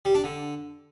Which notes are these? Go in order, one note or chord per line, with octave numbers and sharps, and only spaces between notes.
G3
D4
D3